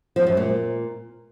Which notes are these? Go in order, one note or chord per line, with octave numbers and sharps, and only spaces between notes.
F3
F#2
A#2